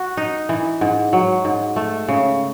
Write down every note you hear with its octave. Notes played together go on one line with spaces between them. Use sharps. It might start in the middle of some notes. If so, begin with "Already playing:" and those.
Already playing: F#4
D#4
E3
G#2
F#3
G#2
A3
C#3